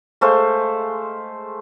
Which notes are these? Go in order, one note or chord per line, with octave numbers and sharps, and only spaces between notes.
G#3 A3 C5 F5